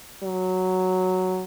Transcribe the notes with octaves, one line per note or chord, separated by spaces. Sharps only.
F#3